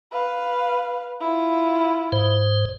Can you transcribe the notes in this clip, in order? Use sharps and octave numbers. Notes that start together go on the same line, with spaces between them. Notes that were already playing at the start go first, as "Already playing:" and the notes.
B4 F5
E4 F4
G#2 C5